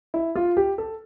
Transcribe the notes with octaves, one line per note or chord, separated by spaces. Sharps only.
E4
F4
G4
A4